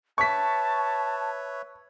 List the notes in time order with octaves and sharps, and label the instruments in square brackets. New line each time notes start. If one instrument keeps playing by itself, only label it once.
[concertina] B4 C#5 E5 [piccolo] A5 [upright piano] C#6 B6